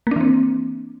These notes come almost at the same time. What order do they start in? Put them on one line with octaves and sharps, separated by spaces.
A#3 D4 E3 C4